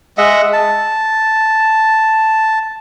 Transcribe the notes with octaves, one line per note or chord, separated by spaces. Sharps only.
G#3 D#5 E5 F#5
A5